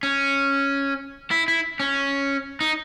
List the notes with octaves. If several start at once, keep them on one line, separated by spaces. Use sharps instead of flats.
C#4
E4
E4
C#4
D#4